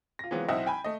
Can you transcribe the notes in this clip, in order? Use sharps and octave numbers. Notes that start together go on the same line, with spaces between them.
F4 A#6
E3 F#3 G#3 B3 C4 F4
B1 C4 E4 D#5 E5 F#5
G5 G#5 B5
A3 D#5